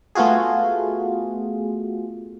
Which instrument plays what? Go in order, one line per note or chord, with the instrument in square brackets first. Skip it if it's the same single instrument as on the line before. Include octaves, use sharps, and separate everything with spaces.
[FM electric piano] A3 B3 F4 F#4 G#4